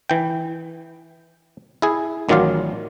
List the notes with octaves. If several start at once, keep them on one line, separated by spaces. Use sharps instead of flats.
E3 G5
E4 G#4
A1 D#3 F#3 F4 D5 F5